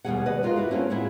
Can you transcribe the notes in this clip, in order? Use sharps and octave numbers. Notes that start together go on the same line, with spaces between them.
D#2 B2 G3 A#3 G#4 F#5
B4 D5 D#5
G#3 F4 F#4 A#4 F5
E4 F#4 G4
A3 A#3 C4 C#4 F4 F#4
A2 E4 F4 G#4 F#5